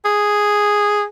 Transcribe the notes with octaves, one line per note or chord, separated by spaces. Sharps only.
G#4